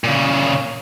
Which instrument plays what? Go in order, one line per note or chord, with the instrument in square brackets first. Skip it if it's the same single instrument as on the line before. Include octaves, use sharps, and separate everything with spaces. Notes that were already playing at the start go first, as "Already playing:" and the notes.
[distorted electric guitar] A#2 C#3